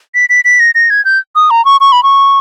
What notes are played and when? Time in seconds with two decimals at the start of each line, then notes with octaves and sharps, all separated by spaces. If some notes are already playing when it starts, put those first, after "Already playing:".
0.15 B6
0.30 B6
0.45 B6
0.60 A#6
0.75 A#6
0.90 G#6
1.05 G6
1.36 D#6
1.51 A#5
1.65 C#6
1.81 C#6
1.92 B5
2.03 C#6